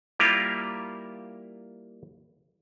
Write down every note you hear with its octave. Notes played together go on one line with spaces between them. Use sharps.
G3 A#3 E4 F4 G4 A#4